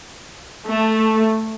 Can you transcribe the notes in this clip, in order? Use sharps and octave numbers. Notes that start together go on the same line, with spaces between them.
A3